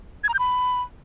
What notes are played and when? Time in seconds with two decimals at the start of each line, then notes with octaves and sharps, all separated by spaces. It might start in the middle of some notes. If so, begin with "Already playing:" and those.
0.24 G#6
0.29 A#5
0.34 G6
0.39 B5